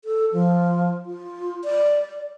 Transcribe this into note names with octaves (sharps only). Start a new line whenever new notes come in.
A4
F3
F4
D5